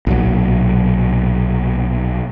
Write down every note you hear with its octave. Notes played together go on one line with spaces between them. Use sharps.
B1 A#2 F#3